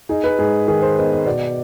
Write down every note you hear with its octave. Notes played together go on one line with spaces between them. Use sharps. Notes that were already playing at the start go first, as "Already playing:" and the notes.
D#4 G#4
B4
G#2 G#4
D#3 G#4
C5
B3 D#5
D#5
B2 D5